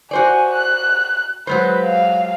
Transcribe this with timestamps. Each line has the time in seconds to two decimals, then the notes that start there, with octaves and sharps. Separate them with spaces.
0.11 F#4 C5 D5 G#5
0.54 F#6
1.47 F#3 G#3 B4 C5
1.85 F5